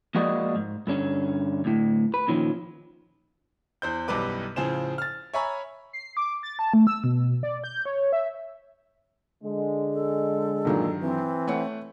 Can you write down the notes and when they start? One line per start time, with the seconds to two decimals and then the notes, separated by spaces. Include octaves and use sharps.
0.15 F3 G#3 A#3 F#4 D5 D#5
0.56 G#2
0.87 G2 D3 C#4
1.65 D2 A2
2.14 B4
2.28 A#2 D#3 F3 C#4
3.82 E2 C5 G6
4.08 B1 F#2 E3 G3 B4 D6
4.56 A2 C#3 F3 G#4 C5 E7
4.98 F6 A6
5.34 C#5 E5 G#5 A#5 B5 C#6
5.93 C7
6.17 D6
6.43 A6
6.59 A5
6.74 A3
6.87 E6
7.04 B2
7.43 D5
7.64 G6
7.86 C#5
8.13 E5
9.44 D3 G#3
9.93 A4
10.65 G2 A#2 D#3 F#3
11.02 E3 C4
11.47 A3 C#5 F#5